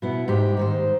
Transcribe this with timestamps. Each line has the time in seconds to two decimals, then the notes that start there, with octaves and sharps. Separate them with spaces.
0.02 B2 B3 E4
0.28 G#2 G4
0.57 G#2 D#3 C5